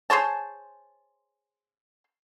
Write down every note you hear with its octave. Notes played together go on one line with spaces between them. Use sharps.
G#4 C5 C#5 A5